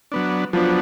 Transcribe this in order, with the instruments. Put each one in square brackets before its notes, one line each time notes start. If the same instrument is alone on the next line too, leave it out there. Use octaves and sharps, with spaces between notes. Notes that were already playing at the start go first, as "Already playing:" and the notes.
[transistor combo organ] F#3 B3 D4
[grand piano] F3 [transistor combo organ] F#3 B3 D4